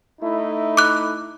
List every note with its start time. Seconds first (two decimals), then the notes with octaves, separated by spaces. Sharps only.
0.22 A3 D#4 E4
0.77 D6 F#6